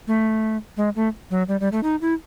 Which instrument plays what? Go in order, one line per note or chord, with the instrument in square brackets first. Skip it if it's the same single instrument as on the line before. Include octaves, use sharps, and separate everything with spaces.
[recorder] A3
G#3
A3
F#3
G3
G3
A3
D#4
E4